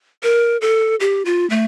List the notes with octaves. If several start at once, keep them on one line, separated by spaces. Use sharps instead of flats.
A#4
A4
G4
F4
A3